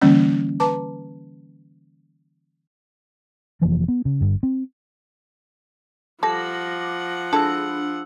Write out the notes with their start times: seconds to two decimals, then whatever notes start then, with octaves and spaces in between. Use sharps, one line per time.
0.02 D3 E3 G3 A#3 C#4
0.60 B4 A5 A#5 D6
3.61 F1 E3 F3 A#3
3.88 B3
4.05 C#3
4.21 G1 G2
4.43 C4
6.23 F3 G3 A4 F#5 D6 A#6
7.33 G#3 D4 E4 A4 E6